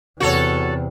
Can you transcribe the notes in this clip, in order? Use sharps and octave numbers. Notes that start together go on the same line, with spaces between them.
E2 C3 F#4 A4 C#5